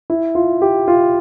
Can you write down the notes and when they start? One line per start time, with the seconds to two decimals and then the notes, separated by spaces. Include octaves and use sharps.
0.10 E4
0.35 F4
0.62 G4
0.88 F4